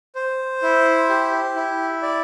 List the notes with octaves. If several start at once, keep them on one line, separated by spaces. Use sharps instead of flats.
C5
E4
G4
E4
D5